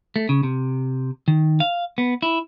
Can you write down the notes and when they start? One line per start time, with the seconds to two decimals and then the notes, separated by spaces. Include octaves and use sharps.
0.16 A3
0.29 C#3
0.43 C3
1.28 D#3
1.60 F5
1.98 B3
2.22 E4